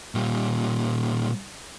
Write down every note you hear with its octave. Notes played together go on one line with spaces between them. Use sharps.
A#2 G3